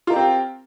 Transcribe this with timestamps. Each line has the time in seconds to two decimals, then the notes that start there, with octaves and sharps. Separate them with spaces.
0.07 F4
0.10 A#4
0.13 G4
0.16 C4